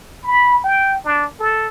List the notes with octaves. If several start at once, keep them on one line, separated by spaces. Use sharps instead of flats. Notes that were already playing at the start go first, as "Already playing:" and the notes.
B5
G5
D4
A4